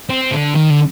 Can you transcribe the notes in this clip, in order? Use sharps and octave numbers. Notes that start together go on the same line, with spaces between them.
C4
D3
D#3
D3